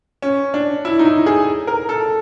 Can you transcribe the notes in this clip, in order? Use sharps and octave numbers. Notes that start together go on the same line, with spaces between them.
C#4
D4
E4
D#4
E4
G#4
A#4
A4